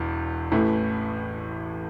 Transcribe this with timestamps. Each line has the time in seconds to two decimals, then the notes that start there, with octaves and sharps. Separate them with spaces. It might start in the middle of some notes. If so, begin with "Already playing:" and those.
Already playing: E1 E2 E3
0.52 A1 A2 E3 A3